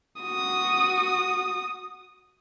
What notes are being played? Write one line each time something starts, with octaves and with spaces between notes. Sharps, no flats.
F#4 D#6